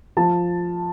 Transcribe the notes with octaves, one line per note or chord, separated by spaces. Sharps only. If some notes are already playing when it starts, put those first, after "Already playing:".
F3 A5